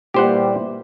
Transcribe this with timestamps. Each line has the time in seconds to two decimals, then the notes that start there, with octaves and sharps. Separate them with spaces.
0.14 A#2 E3 G3 G4 C5 F#5